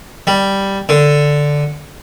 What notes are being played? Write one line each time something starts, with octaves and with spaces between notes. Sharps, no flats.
G3
D3